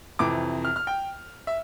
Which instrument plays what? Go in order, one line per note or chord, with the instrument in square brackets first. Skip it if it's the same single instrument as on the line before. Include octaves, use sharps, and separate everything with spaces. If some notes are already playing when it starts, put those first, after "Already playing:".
[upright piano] F2 C3 E3 D6
F6
F6
G5
E5